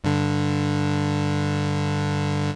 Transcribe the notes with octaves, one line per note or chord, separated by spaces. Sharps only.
G2 D3